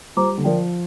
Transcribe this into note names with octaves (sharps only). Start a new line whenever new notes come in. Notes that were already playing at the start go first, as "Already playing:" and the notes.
G3 F4 C5 A#5 D6
D3
F3 A#4 D5 G5